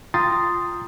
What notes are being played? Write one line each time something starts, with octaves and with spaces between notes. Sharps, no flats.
F4 G5 A#5 C6 D#6 A6